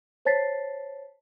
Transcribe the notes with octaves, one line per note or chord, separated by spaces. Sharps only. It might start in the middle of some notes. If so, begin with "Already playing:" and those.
C5 C#5 A5 A6 B6 C7